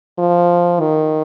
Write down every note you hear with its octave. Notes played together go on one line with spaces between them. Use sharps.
F3
D#3